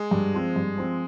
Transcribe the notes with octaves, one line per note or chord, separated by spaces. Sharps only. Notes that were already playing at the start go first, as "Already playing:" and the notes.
Already playing: G#3
G2
F3 C4
G2
F3 C4